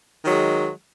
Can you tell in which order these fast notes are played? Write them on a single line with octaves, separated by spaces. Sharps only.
D#3 F#3 G#3